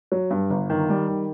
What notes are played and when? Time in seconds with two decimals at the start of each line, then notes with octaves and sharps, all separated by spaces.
0.12 F#3
0.31 G2
0.50 G1
0.70 D#3
0.90 G3
1.08 D#3